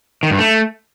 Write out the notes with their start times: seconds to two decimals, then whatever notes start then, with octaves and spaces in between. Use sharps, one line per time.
0.23 D#3
0.31 G2
0.38 A3